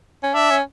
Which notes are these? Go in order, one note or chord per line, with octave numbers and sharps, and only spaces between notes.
C#4
D4 E5
C#4